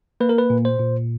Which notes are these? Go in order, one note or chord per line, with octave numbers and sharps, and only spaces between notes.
A#3 B4
A#4
B4
A#2
C5
A#2